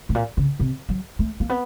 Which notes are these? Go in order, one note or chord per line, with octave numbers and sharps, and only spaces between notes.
A2
A#2
C#3
C3
F#3
A3
A#3
B3